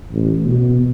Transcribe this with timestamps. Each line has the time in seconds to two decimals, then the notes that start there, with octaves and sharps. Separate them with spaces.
0.12 A1
0.45 B2